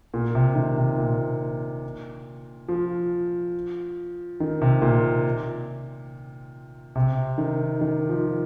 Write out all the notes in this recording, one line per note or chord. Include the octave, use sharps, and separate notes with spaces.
A#2
C3
D#3
C3
A#2
F3
D#3
C3
A#2
C3
D#3
D#3
F3